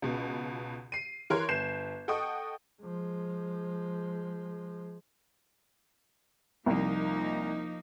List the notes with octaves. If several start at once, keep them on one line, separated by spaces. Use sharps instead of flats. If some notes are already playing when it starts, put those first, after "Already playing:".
C#2 B2
C7 D#7
E3 A#4 C#5 C6 F#6 G#6
G1 G6 C7 E7
A4 D#5 F#5 G5 C#6 D#6
F3 G#3
C2 F3 A#3 D#4